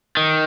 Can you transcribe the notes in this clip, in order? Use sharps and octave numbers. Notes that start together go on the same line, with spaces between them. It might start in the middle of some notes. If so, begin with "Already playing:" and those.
D#3